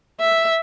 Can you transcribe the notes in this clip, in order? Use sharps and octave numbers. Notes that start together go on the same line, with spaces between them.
E5